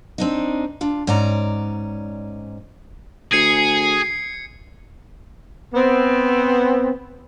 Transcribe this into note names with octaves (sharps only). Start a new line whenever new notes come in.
C4 D4 D#4
D4 F4
G#2 C#4 D5 A#5
D2 G#4 G#6 C7 C#7
B3 C4